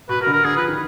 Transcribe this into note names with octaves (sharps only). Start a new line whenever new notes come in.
B2 B4
B2 A#4
D3
A#4
D3 G#4
F3 B4
D#3